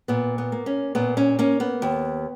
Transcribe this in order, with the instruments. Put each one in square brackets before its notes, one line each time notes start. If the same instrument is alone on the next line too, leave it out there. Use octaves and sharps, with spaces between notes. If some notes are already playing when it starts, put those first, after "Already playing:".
[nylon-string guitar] A#2 B3
B3
A#3
C#4
A#2 B3
C#4
A#3 C#4
B3
D#2